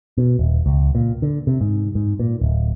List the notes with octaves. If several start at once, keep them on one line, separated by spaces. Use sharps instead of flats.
B2
D#1
C#2
A#2
D3
C3
G#2
G#2
A#2
D1